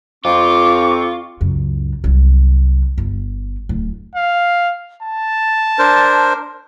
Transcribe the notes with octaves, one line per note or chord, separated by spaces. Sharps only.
F2 C4 F4 C#6 D6
C#2 F#2
C2 F#3
G1
D1
F5
A5
D4 A#4 C5